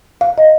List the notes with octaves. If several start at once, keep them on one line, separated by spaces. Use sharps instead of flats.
F5
D#5